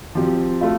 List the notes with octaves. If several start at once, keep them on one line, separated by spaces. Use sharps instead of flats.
F3 C4 G4
A3 F4